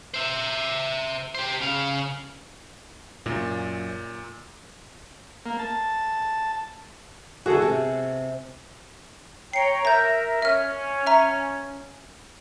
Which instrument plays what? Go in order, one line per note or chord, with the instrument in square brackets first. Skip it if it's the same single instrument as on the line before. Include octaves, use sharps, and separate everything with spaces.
[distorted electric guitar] C5 E5
G4 C5
C#3 F5
[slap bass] F#2 [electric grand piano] A#2
[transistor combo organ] A#3
A5
[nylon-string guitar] D3 E3 [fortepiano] F#4 G#4 A4
[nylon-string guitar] C3
[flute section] C#5 G5 A#5 [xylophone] C7 C#7
[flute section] A#4 E5 [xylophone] A#5 G6
[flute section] C#4 [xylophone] E5 F6
[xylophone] E5 A#5